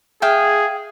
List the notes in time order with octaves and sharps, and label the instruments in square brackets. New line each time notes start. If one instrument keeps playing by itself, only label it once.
[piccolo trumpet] G#4 [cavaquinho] E5 F5 G5